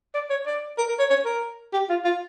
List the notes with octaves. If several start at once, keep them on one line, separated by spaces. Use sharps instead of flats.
D5
C#5
D5
A#4
A#4
C#5
C#5
A#4
G4
F4
F4